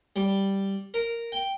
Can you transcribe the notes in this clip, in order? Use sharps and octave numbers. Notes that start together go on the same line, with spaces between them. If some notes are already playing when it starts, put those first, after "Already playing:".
G3
A#4
G5